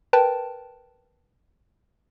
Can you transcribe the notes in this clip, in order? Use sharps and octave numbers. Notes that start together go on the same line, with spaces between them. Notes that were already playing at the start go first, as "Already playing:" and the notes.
A#4 B4 G5 A5